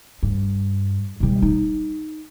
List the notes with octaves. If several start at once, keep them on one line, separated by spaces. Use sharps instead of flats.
G2
B1 G3
D#4